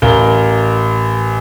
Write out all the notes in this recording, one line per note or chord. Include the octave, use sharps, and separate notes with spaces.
A1 A#4 F5 G7